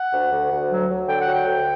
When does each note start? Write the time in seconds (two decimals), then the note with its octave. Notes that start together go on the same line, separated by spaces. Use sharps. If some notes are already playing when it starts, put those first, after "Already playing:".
Already playing: F#5
0.13 D2
0.32 D2
0.51 D2
0.70 F#3
0.89 F#3
1.08 D3 G5
1.21 F#5
1.26 F#3
1.33 G5
1.45 D2